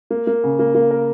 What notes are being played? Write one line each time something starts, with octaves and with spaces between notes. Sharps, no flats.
A#3
A#3
C#3
A#3
A#3
A#4